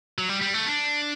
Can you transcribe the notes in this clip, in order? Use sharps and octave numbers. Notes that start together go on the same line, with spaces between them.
F#3
G3
G3
A3
D4